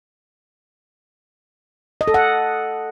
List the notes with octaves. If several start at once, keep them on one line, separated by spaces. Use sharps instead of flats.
D#5
A4
F#5